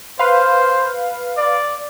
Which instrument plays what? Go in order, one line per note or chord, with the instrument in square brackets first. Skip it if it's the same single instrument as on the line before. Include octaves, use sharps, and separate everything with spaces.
[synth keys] B4 F5 [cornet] C5
[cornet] D5